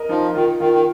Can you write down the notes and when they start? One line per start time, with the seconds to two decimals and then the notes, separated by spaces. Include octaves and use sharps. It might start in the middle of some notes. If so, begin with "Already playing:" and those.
Already playing: A#4 D#5
0.09 F3 D#4
0.35 D#3 F4
0.60 D#3 F4
0.73 D#3